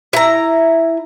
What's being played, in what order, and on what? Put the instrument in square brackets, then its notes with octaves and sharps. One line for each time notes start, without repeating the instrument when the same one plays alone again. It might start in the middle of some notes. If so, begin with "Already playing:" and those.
[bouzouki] E4 A#5